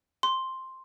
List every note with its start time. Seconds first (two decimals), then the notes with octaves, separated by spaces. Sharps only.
0.23 C6